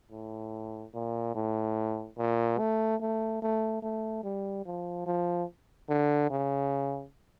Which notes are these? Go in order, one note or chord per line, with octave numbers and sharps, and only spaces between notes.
A2
A#2
A2
A#2
A3
A3
A3
A3
G3
F3
F3
D3
C#3